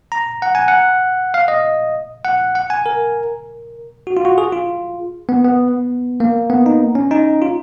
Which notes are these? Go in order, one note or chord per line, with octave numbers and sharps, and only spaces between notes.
A#5
F#5
G#5
F#5
F5
D#5
F#5
F#5
G#5
A#4
F#4
F4
F#4
G#4
F4
B3
B3
A#3
B3
D#4
C#4
D#4
F4